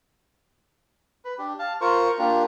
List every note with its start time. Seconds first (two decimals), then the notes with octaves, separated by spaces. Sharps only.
1.25 B4
1.39 D4 G4
1.59 F5 A5
1.81 F4 A#4 C5 C#6
2.19 A#3 D4 F4 G4